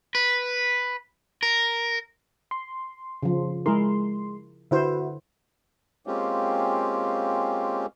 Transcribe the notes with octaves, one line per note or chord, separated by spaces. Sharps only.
B4
A#4
C6
C#3 F3
G#3 E4 G#4 A#4 C6
D3 E4 F#4 B4 C5 E5
G#3 A#3 C4 C#4 F4 G4